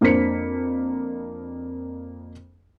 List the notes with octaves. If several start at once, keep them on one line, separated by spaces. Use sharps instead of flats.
F2 A#3 D4 C5 B6 C#7